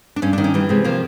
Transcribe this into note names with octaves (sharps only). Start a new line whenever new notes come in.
D4
G2 C#4
D4
D#3
C#4
E3 G3
C3 G#3
F3 A#3